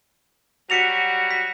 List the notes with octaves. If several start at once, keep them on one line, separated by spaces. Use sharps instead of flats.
F#3 G3 F#4 B6 C#7 F7
B6